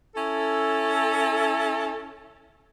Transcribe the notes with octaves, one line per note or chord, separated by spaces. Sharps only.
C#4 E4 A4